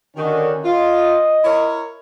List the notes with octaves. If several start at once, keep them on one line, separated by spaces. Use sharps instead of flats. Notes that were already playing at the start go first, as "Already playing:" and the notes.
D3 D#3 C#4 F#4
F4 D#5
E4 A#4 C#5